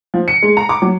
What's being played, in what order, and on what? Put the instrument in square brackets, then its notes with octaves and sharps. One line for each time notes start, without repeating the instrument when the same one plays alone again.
[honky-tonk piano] F3
C#7
G#3
A#5
D6
F#3